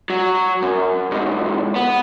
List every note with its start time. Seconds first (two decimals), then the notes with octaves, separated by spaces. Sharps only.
0.10 F#3
0.62 F#2
1.11 B1 G#2
1.76 B3